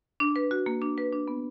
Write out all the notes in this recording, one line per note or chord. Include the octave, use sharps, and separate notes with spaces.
D4
B4
F#4
A#3
D4
B4
D4
B3